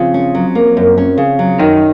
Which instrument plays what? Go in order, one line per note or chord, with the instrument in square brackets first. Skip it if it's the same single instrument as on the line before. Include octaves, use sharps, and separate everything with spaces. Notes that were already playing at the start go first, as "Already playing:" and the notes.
Already playing: [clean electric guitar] F2 F3 [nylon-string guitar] C#3
[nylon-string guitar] C#4
F#3
A#3
F#2
C#4
C#3
F#3
[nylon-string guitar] F#2 [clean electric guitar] D#3 D#4